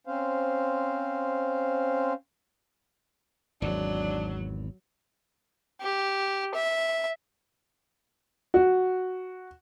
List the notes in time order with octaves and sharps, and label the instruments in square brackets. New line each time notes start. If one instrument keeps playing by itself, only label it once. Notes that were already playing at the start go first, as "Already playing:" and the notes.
[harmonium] C4 C#4 C5 F5
[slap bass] G#1 E2 [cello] F#3 [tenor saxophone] D4
[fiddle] G4
E5
[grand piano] F#4